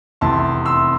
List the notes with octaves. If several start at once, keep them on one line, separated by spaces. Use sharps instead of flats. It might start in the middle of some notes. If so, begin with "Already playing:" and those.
F1 E2 C3 A5 C6
C6 E6